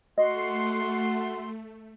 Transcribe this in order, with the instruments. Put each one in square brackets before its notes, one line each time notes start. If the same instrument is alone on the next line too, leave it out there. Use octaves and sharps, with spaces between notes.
[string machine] A3 [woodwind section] F#4 F#5 C6 [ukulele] D#5